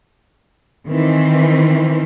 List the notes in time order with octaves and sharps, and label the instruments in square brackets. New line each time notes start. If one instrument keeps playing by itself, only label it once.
[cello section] D#3 E3 C4